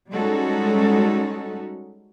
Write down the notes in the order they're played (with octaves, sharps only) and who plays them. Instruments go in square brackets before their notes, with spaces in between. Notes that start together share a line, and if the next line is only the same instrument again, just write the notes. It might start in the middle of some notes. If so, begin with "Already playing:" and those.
[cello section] G3 G#3 C#4 D#4 F#4 A4